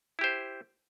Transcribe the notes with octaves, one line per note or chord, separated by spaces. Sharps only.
E4 G4 C5